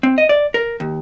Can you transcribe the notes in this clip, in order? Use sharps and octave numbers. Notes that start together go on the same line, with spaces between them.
C4
D#5
D5
A#4
D#2